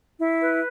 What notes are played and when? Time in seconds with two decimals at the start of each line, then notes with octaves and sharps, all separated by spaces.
0.20 E4
0.41 B4